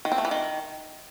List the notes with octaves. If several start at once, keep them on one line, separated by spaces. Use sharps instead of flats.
D#3
C4
A3
E3
D#3